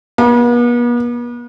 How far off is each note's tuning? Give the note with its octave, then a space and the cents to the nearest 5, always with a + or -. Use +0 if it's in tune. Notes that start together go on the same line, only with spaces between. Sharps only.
B3 -45